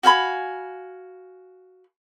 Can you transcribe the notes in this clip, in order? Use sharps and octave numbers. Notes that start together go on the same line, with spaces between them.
F#4 F5 G#5 B5